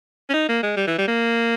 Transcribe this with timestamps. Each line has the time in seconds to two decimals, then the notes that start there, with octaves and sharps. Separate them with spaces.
0.29 C#4
0.34 D#4
0.49 A#3
0.63 G#3
0.77 G3
0.87 E3
0.98 G3
1.08 A#3